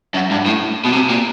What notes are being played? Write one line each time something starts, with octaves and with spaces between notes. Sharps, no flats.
F#2
G2
A2
B2
C3
A#2